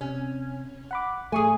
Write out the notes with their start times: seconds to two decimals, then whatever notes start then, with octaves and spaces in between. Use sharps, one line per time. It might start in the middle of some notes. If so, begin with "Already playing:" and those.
0.01 C3 C#4
0.91 F#5 B5 D6
1.32 A1 A3 G#4 G#5 C#6 D#6